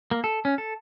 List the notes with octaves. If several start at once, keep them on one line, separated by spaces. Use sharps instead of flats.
A#3
A4
C#4
A4